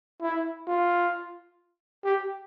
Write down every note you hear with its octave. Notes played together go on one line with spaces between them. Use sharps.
E4
F4
G4